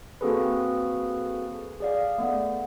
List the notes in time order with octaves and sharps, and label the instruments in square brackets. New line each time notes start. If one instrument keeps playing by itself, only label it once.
[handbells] A#3 C4 F#4 G#4 A4 B4
G#4 D5 F5
A3 B3